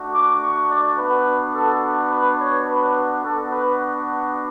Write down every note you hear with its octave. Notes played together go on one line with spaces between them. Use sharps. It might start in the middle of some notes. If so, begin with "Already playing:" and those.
Already playing: A3 D4 F#4
D6
C#6
D5
B3 D4 F#4 B4
A4
B4
C#5
B4
B3 D4 F#4 A4
B4